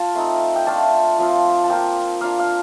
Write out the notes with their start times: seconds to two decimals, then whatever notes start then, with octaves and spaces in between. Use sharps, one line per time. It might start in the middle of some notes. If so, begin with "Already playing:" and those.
Already playing: F4 A5
0.14 A3 C4 D#4
0.56 G5
0.66 A3 D4 F4 A5
1.18 F3 C4 F4
1.64 A5
1.70 F3 A#3 F4 G5
2.21 A#3 D4 F4 F5
2.39 F5